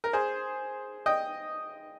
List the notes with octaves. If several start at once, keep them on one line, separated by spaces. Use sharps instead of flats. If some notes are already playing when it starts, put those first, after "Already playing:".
A#4
G#4 C5
D#5 G5